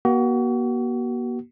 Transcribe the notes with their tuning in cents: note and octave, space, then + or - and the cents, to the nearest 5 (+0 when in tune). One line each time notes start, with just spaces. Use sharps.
A#3 +45 F#4 +35